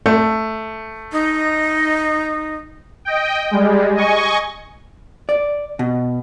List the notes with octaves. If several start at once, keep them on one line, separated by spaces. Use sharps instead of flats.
A3
D#4
D#5 G5
G3 G#3
D#5 G#5 C#6
D5
B2